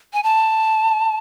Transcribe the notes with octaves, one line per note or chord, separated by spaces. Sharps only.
G#5
A5